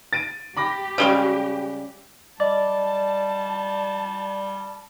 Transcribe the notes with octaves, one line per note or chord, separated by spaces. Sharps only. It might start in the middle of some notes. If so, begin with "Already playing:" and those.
A6 D7 D#7
G4 B5 D6 A#6
C#3 G3 G#3
G3 D5 D#5 A5